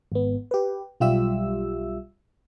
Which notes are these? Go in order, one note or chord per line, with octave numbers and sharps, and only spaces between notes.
G#1 B3
G4 B4
B1 G3 F4 G4 E5 E6